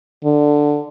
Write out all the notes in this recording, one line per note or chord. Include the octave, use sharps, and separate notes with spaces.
D3